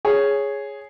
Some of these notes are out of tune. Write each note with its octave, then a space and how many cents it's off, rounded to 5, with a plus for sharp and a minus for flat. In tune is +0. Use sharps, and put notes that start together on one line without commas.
G#4 +0 C#5 +0